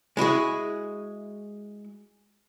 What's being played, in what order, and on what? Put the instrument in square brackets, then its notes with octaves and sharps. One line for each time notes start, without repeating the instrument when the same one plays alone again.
[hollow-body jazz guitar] G#3 E4 F#4 G#4